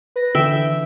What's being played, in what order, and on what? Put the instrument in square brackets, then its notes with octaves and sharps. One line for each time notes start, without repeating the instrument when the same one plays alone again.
[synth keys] B4 A#6
[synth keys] D3 E3 [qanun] E5 G5